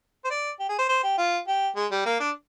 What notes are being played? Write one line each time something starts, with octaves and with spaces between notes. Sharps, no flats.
C5
D5
G4
G#4
C5
C5
G4
F4
G4
G#3
G3
A#3
D4